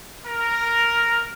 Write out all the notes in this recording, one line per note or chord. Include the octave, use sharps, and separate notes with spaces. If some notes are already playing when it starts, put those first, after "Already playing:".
A#4